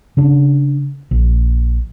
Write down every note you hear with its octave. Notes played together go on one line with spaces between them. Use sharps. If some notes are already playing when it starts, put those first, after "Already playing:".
C#3 D4
A#1